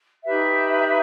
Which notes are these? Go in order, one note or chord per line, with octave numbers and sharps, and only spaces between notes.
D#4 G4 B4 E5